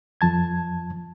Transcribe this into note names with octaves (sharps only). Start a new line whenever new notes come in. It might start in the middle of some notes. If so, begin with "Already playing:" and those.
F2 F3 A5 G#6